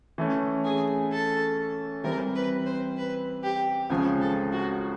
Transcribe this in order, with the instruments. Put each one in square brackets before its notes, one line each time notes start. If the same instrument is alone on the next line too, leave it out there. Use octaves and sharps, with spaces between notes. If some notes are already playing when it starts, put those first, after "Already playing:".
[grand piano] E3 A3 C#4
[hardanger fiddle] G#4
A4
[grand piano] E3 G3 C4 [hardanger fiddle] A#4
[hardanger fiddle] B4
C5
B4
G4
[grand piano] C#2 C#3 F3 [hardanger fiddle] G#4
[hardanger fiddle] A4
F#4